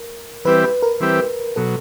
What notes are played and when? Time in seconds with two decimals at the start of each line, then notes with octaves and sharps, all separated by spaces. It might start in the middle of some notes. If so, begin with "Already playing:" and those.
Already playing: A#4
0.45 E3 G3 C4 E4 G4 B4
0.64 B4
0.83 A#4
1.00 E3 G3 C4 E4 G4
1.56 B2 F#3 A4